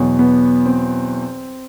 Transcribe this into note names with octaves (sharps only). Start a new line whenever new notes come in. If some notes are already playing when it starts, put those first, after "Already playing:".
Already playing: E2 B2 F#3
B3
C4